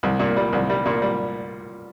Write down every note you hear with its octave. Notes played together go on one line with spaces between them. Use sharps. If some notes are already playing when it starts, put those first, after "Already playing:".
C2
A#2
G3
C2
G3
A#2
G3